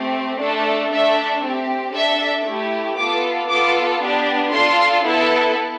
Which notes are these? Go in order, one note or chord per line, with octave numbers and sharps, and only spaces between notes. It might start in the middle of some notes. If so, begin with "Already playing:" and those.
Already playing: A3 C4 G4
A3 D4 A4
A3 D4 A4 E5
C4 G4
D4 A4 E5
A3 E4 G4
B3 F4 A4 D6
B3 F4 A4 D6
B3 D4 G4
D4 F4 A4 C6
B3 E4 A4